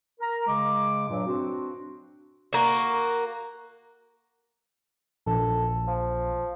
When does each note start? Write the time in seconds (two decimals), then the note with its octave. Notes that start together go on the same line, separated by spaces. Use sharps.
0.20 A#4 A#5
0.48 C#3 G#3 D6
1.09 G2 A#2 F#3
1.26 C4 D4 F#4
2.53 A#3 F#4
5.27 A#1 A4
5.88 F3